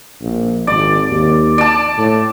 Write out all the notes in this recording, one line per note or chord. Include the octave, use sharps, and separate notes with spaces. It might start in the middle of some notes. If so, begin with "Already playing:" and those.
A#1
G#1 D5
D#2
D5 A5
A2